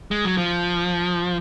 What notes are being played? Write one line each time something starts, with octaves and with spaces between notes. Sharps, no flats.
G#3
F#3
F3